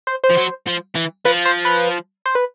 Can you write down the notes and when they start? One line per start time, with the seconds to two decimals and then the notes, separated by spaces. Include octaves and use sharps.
0.07 C5
0.24 C5
0.30 F3
0.37 F#3
0.67 F3
0.95 E3
1.25 F3 B4
1.45 C5
1.65 B4
2.26 C5
2.35 B4